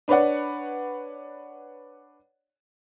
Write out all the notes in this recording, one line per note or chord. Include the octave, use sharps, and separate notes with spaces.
D4 B4 C#5 D5 F#5